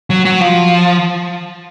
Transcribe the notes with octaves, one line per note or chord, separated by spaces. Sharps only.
F#3
F#3
F3